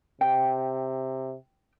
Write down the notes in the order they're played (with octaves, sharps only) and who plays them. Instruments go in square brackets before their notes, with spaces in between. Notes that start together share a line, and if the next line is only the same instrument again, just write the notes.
[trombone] C3 [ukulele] G5